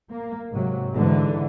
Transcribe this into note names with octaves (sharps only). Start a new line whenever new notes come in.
A#3
G#2 C3 F#3
G#2 D3 E3